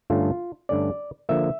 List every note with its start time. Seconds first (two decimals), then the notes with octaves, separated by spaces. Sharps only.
0.10 G2 D3 A3 C#4 F4
0.69 G2 D3 A3 C#4 D5
1.29 D3 F3 A#3 E5